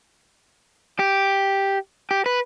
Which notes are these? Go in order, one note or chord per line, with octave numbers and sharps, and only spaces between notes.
G4
G4
B4